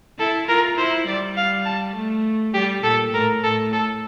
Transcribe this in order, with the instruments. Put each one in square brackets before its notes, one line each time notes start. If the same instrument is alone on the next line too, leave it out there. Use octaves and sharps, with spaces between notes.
[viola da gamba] E4 [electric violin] A4
[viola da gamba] F4 [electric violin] A#4
[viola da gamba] E4 [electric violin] C5
[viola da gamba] G3 [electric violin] D5
[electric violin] F5
A5
[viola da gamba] A3
[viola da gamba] G3 [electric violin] G4
[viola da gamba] A#2 [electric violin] A4
[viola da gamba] A2 [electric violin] A#4
[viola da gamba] A2 [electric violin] A4
[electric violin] A4